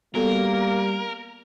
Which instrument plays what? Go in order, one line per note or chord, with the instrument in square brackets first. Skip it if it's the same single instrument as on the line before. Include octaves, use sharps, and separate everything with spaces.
[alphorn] G3 [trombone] A#3 [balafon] B3 F#4 A4 [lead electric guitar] A#4